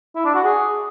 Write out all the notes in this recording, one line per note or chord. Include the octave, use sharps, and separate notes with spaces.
E4
D4
F#4
G#4